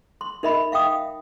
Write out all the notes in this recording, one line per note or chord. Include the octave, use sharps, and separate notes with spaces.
C6
D#4 A#4 D#5 E5 B5
E5 F5 G5 D#6